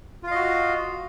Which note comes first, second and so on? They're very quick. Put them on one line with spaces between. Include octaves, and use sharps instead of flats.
F4 F5 D#5 F#4